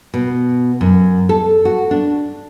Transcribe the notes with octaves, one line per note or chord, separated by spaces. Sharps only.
B2
F#2
A4
F#4
D4